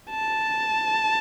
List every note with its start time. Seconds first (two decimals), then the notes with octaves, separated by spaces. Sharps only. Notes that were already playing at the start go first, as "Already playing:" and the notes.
0.10 A5